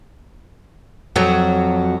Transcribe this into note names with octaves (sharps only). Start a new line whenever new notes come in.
F2 F#3